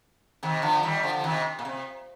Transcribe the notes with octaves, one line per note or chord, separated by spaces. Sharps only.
C3 D#3
D3 F3
D#3 G3
D3 F3
F3
C3 D#3
A#2
C3